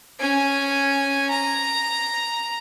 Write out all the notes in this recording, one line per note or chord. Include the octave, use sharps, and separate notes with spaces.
C#4 G#5
A#5